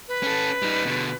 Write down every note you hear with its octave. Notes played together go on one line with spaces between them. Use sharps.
B4
C#4 A4
G3 D#4
B2 D3